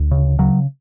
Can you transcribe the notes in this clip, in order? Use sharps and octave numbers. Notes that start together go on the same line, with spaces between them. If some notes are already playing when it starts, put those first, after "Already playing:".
Already playing: D2
C#3
C#3 F#3